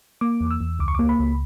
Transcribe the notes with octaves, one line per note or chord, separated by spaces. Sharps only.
A#3 D6
E2
E6
E2
C#2 D6
C#6
A#3 D6
B5
C#2